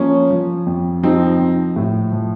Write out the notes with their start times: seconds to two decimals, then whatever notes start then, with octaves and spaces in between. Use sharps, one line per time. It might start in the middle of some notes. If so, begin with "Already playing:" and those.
Already playing: F3 A#3 C#4
0.30 F3
0.66 F2
1.03 F3 C4 D#4
1.39 F3
1.76 A2
2.12 F3